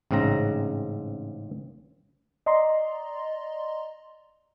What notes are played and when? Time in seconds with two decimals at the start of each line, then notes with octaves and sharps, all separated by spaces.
0.11 A1 G#2 C#3 C4 A#5
2.46 D5 D#5 A#5 C6